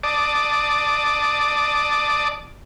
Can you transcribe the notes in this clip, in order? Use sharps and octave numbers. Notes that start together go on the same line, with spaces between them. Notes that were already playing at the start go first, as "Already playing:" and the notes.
D5 A5 D6 D#6